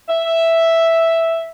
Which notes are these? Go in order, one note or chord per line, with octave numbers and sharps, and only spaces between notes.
E5